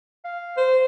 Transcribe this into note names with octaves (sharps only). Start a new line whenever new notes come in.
F5
C5